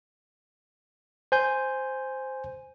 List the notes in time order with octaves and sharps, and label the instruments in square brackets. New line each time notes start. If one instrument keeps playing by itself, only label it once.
[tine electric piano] C5 G#5 G6